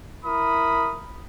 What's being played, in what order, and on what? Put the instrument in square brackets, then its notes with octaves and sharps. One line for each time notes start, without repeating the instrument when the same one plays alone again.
[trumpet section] E4 A#4 B5 D#6